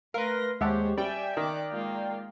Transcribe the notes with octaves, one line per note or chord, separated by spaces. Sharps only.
A3 A#4 B4 F5 C6 A#6
D#2 G#3 G4 C5 C#5 E5 F#5 A5
G3 D5 E5 G5 G#5
D#3 D6 F#6
G#3 A#3 F4